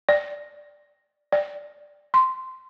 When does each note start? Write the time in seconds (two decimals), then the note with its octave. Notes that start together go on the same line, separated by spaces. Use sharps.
0.09 D5
1.32 D5
2.14 C6